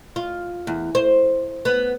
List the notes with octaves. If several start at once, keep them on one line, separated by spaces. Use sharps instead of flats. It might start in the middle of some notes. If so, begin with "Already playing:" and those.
F4
E2
C5
B3